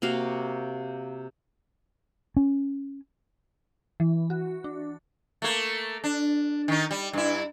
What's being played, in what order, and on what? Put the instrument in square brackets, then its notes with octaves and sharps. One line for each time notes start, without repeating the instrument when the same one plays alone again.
[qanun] C3 A#3 F#4 F5
[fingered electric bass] C#4
[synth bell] E3
F#4
D4
[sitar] A3 A#3
D4
D#3 D#4
G3
G2 E4